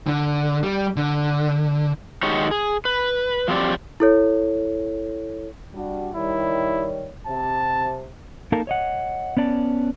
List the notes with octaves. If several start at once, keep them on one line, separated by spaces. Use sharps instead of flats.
D3
G3
D3
D#3 G#3 D#4 F#4 G4 C#5
G#4
B4
F3 F#3 C4 G4 D5
E4 A4 C#5
G3 D4 F#4
D#3 G3 E4 C#5
C3 A5
A#3 D#4 A4 A#4 F5 A5
C#5 D#5 F#5
B3 C#4 D5 A5